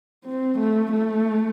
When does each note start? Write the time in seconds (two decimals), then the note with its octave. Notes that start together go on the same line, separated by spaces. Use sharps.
0.25 C4
0.58 A3
0.91 A3